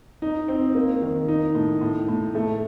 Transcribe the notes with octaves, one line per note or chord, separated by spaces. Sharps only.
D#4
C4
A#3
D#3
D#4
A2
A2
A2
A3